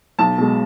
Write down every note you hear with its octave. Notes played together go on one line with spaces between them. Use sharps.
B1 A5
B2 G#3